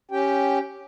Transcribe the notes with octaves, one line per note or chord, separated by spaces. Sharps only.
C#4 G4 G5